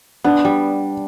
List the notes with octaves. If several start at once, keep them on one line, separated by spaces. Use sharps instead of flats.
B3 D4
G3